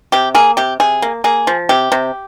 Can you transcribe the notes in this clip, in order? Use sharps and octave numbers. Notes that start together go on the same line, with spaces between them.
C3 G4
A#3 G#4
C3 G4
C3 G#4
A#3
A#3 G#4
F3
C3 G4
C3